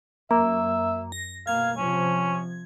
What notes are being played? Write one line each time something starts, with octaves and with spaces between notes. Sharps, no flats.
F#2 A#3 E5
A#6
B2 A#3 F5 G#6
C3 F3 C#4